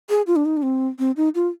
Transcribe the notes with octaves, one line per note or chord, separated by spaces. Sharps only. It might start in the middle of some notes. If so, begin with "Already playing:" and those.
G#4
F4
D4
D#4
D4
C4
C4
D#4
F4